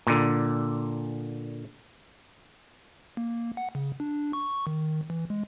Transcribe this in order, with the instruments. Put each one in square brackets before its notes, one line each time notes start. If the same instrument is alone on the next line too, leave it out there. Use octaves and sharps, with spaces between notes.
[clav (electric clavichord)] A#2 D3
[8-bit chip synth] A#3
F#5
C#3
D4
C#6
D#3
E3
G#3